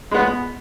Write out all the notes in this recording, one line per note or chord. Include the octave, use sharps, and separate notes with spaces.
G#3 B3